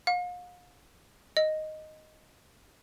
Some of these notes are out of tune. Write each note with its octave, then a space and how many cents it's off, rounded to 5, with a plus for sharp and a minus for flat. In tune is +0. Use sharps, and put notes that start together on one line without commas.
F5 +40
D#5 +0